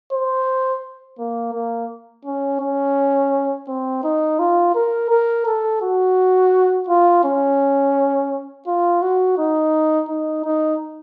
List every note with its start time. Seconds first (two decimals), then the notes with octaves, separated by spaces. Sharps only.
0.12 C5
1.19 A#3
1.54 A#3
2.25 C#4
2.60 C#4
3.68 C4
4.03 D#4
4.39 F4
4.75 A#4
5.10 A#4
5.46 A4
5.82 F#4
6.89 F4
7.24 C#4
8.67 F4
9.02 F#4
9.38 D#4
10.09 D#4
10.45 D#4